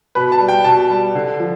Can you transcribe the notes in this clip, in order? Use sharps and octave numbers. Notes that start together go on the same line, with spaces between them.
B2 B4
A5
G3
G5
B2 A5
G3
D3
F3